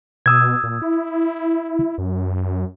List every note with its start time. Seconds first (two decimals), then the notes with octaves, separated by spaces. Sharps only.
0.26 B2 D#6 E6 G#6
0.64 A#2
0.82 E4
1.98 F#2